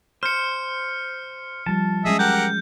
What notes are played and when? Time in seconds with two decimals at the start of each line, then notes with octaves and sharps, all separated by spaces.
0.23 C5 F6 C#7
1.66 F3 G3 A5
2.05 F#3 G#3 C#4 G#4 D#5 E5
2.19 G4 A#4 F#5 G6